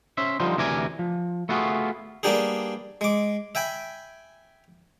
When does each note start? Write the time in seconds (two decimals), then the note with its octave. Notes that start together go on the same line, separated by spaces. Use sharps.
0.17 C#4 C5 E5
0.40 D3 F3 G3 D#4 F4 C5
0.57 D2 C3 E3 A#4 D5 G#5
0.99 F3
1.49 A3 B3 F4 F#4 G#4
2.23 G3 A#3 B3 D4 G4 G#4
3.01 G#3 D6
3.55 E5 G5 G#5 B5